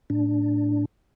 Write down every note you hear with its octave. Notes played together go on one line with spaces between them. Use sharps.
A2 D4